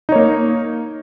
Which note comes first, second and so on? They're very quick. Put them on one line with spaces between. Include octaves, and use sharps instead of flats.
D#4 C#5 A#3